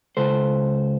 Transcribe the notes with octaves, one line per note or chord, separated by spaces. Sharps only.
C#2 A4 C5